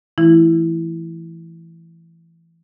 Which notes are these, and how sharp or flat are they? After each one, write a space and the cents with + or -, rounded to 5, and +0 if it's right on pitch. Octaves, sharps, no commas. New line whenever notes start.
E3 +15 A3 +0 E4 +0